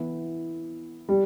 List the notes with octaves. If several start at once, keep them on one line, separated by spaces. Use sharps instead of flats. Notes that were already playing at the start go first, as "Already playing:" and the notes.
Already playing: E3 B3 E4
G3